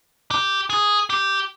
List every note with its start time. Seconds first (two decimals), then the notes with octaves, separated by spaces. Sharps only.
0.31 G4
0.70 G#4
1.10 G4